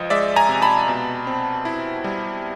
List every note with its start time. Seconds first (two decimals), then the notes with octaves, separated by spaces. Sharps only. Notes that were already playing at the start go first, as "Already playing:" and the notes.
Already playing: C#2 F3 D#5
0.10 G#3 D5 E5
0.36 G#5 A#5
0.49 C3
0.62 A5 B5
0.88 B2
1.27 C4
1.65 E4
2.04 G3